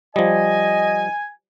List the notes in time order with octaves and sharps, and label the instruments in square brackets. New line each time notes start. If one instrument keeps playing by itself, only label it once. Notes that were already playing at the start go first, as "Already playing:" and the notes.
[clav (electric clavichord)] F3 G3 [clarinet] D#5 [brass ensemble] G#5